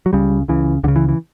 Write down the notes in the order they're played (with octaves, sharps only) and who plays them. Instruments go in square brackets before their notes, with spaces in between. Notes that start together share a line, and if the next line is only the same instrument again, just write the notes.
[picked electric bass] F#3
C#2 C#3 G3
C#2 C#3 E3
C#2 D3
C#3
E3
E3